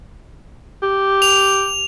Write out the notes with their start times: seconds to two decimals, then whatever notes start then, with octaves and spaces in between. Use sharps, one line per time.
0.83 G4
1.22 F7